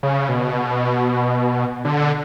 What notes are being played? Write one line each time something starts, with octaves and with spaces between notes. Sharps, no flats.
C#3
B2
D3